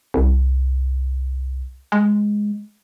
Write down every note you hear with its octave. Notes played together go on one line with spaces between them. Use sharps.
C2
G#3